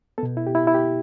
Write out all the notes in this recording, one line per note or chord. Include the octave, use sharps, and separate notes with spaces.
B2 B3 A4
E4
G4
E4
E4
G4